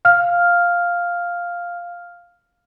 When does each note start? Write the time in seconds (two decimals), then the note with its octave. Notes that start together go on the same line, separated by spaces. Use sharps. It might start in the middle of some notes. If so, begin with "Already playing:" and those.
0.05 F5 F6